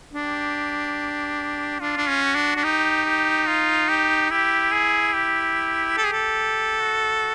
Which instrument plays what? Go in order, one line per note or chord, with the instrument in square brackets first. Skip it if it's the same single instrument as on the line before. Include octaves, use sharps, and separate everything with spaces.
[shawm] D4 [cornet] G4
[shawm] D4 [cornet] F4
[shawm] D4
C#4
[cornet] F#4
[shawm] D4
D4
[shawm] D#4 [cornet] G4
[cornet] G4
F4
G4
[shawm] E4 [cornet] G4
[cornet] G#4
G4
[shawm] A4
G#4
A4
[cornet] F#4